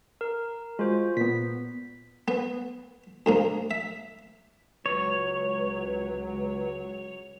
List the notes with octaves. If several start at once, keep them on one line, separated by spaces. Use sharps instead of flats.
A#4
G#3 F4 F#4 C5
A#2 B3 B6
B3
D2 G#2 A#3
E5
C#2 F#3 B4 C#5